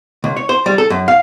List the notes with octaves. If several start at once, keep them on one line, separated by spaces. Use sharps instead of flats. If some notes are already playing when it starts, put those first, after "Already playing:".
C#2
C#5
C5
G3
A4
F#2
F5